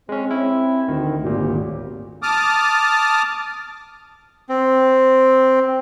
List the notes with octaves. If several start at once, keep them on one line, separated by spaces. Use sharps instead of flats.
G#3 C4 C#4
E4
D2 D#3
G#1 D2 A#2 C#3 B3 G4
A5 D6 D#6 F6
C4